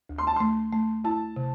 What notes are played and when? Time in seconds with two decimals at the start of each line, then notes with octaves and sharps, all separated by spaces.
0.09 D2
0.18 C6
0.27 A5
0.36 A3 C6
0.73 A3
1.04 E4 A5
1.36 C3